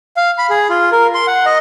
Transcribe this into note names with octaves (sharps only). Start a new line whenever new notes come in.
F5
B5
G#4
F4
A#4
C6
F#5
D#5